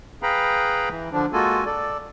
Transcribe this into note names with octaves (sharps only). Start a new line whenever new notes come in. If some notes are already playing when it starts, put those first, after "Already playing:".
G#4 B4 F5 G5 A#5 B5
E3
D3 F3 D4
G#3 A#3 F4 F#4 A4 G#5
A4 D5